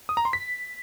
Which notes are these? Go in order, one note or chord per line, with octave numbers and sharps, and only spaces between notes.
D#6
A#5
C6
B6